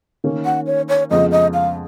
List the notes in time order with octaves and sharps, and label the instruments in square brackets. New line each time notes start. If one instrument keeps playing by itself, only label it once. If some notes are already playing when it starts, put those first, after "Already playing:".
[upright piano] D#3 A#3 C#4
[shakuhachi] F#5
C#5
C#5
[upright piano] F2 C#3 F3 G#3 B3 [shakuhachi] D#5
[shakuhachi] D#5
F5